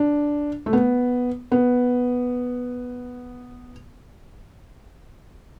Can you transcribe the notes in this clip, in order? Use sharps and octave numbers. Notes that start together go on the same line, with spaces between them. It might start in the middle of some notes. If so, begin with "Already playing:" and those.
Already playing: D4
A3
B3
B3